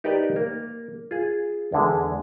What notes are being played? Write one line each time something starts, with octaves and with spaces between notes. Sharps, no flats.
D#4 G4 A#4 B4 D5 D#5
A#3 A#4
F4 G#4
E2 D3 G#3